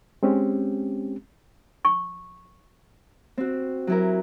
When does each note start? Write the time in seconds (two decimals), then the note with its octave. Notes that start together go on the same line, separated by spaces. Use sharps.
0.23 G#3 C4 C#4 G4
1.85 C#6
3.38 C4 F#4
3.87 F#3 E4 A#4